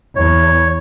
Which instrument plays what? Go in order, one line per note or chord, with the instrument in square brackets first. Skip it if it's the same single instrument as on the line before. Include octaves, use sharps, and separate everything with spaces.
[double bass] E2 [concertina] C#5